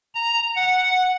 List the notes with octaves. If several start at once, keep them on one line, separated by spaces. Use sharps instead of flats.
A#5
F#5